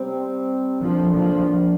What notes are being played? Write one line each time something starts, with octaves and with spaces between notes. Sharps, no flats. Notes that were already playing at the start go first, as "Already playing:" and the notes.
Already playing: C3 G3 C4
F2 D3 F3 A#3 D4
F3